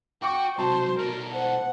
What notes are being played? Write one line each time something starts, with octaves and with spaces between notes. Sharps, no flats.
F#4 G5 C#6 D6
B1 C3 F#4 C5 A5
B2 A3 A#4
C5 F#5